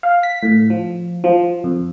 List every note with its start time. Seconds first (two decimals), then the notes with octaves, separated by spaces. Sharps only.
0.03 F5
0.23 B6
0.43 A2
0.70 F3
1.24 F3
1.64 F2